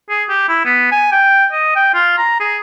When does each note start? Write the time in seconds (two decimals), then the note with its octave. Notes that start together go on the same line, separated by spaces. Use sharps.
0.10 G#4
0.29 G4
0.49 E4
0.65 B3
0.91 G#5
1.12 G5
1.52 D#5
1.76 G5
1.94 F4
2.18 A#5
2.40 G#4